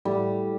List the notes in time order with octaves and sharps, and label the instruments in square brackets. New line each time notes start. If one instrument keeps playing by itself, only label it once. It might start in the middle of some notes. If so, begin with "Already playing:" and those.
[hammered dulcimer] A2 G3